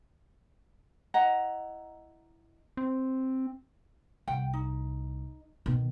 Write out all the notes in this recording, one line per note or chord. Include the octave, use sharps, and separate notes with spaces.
E4 D#5 F#5 A#5
C4
C2 F#5 G5
D#4
B2 D#3